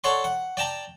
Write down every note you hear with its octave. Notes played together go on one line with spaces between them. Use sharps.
A4 C#5 D5 F#5 C6
F#5
D5 G5 A5 A#5